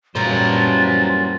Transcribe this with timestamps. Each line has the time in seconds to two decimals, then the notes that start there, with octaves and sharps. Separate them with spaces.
0.16 F#2 A#2 E3 F#3 G3 A#4 C5 A6